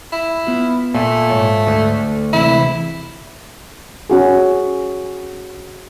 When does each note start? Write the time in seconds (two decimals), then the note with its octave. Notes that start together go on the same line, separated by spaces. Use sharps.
0.13 E4
0.47 B3 F4
0.95 A#2 A3
1.30 G#2 F3 C#5
1.67 D2
2.33 C3 E3 G#3 E4
4.10 C#4 F#4 G#4